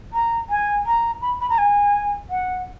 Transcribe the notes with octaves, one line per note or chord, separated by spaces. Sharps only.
A#5
G#5
A#5
B5
B5
A#5
G#5
F#5